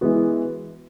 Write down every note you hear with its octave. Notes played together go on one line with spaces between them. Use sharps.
E3 G#3 B3 F#4